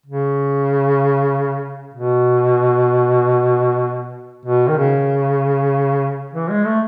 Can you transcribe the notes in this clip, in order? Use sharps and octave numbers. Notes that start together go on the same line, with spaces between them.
C#3
B2
B2
D#3
C#3
E3
G#3
A3